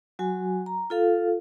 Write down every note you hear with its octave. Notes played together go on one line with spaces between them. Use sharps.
F#3 F#4 G#5
A#5
F4 A4 F5